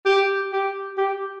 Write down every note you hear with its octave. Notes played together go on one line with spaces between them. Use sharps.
G4
G4
G4